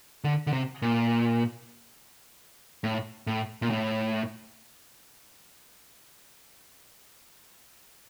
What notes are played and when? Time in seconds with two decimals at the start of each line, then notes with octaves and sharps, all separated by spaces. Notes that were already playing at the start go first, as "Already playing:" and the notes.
0.24 D3
0.47 D3
0.53 C3
0.82 A#2
2.84 A2
3.27 A2
3.62 A#2
3.70 A2